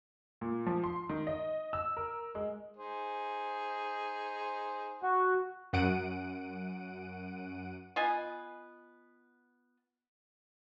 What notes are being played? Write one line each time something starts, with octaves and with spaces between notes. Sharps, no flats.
A#2
F3
C6
D#3
D#5
E6
A#4
G#3
D#4 G#4 C5
F#4
F#2 F#5 D7 D#7
B3 F4 D#5 G#5